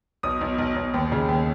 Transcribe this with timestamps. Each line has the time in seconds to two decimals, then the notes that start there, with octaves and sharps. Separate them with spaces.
0.23 B1 D#6
0.41 B1
0.58 B1
0.76 B1
0.94 D#2
1.12 C#3
1.28 D#2